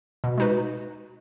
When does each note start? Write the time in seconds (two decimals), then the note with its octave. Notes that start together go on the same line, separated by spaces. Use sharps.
0.24 B2
0.38 G#3 D#4 F#4 B4